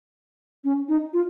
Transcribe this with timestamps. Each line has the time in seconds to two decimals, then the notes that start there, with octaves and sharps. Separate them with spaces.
0.64 C#4
0.89 D#4
1.13 F4